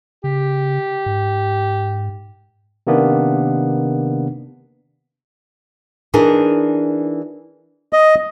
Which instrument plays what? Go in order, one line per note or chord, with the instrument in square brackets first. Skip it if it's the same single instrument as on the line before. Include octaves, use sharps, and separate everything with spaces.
[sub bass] C#3 [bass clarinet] G4
[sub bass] G#2
[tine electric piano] C3 D#3 A#3 B3 D4
[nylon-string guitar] E3 D4 D#4 G#4 A#4
[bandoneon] D#5